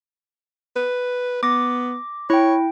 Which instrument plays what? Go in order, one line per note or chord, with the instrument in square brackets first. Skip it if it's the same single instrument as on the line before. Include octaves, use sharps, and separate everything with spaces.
[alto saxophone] B4
[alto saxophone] B3 [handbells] D6 A#6
[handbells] E4 G5 [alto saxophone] C#5